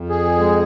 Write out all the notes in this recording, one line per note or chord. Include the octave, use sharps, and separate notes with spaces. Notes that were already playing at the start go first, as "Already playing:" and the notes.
Already playing: F2
G#4
G#3